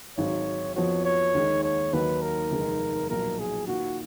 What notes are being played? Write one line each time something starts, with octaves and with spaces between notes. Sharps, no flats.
G#1 G#2 F#3 C#5
F2 F3 B3 F#4 C#5
C#5
D#2 D#3 G#3
C#5
D#2 D#3 F#3 A#3 D#4 B4
A#4
F1 D#2 D#3 G#3
B1 A#2 F3 A#4
G#4
D#3 A#3 F4 F#4